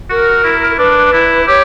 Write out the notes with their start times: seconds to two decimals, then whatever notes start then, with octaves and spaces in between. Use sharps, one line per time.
0.10 F#4 A#4
0.44 E4
0.78 D4 B4
1.13 E4
1.47 G4 C#5